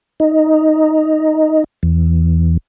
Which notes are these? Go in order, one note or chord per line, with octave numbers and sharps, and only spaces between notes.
D#4
E2